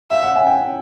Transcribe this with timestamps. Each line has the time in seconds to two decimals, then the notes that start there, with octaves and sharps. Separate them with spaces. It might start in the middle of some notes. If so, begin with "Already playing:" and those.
0.11 E5 F5
0.23 F#5
0.36 G#5
0.47 G5